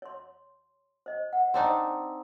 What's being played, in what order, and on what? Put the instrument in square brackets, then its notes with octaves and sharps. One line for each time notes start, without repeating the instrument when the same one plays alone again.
[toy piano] C#5 C6
C5 D#5
F#5
[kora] C4 D4 D#4